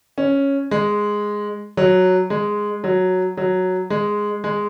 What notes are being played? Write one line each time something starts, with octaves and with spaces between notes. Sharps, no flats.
C#4
G#3
F#3
G#3
F#3
F#3
G#3
G#3